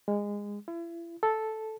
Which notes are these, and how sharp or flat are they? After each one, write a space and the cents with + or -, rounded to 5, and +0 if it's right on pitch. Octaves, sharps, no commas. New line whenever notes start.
G#3 -20
E4 +40
A4 -5